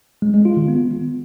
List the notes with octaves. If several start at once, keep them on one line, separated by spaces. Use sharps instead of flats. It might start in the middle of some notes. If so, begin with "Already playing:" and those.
G#3
G#3
F4
D#3
B3